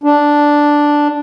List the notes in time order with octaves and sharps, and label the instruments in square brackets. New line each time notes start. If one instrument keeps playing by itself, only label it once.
[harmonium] D4